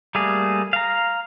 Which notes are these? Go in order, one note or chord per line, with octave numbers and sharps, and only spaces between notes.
G3 A3 A#3 G#4
F5 A#5